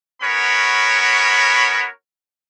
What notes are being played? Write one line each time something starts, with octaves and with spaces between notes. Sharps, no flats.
B3 C#4 F#4 A#4 C#5 B5